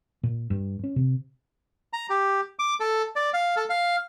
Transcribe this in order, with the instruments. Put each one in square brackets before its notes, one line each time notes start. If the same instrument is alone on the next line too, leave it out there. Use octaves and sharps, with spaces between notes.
[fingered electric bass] A#2
G2
C#4
C3
[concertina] A#5
G4
D6
A4
D5
F5
A4
F5